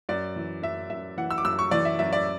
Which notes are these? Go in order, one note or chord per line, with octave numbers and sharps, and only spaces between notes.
F#2 D5
E3
F#2 E5
F#2 E5
E3 F#5
E6
D6
F#2 E6
C#6
E3 D5
E5
F#2 E5
D5